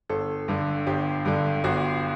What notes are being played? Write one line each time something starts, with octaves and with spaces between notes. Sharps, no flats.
G1 A4
G2 D3
G1 G4
G2 D3
G1 F#4